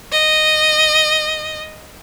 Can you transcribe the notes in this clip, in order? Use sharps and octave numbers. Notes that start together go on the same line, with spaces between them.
D#5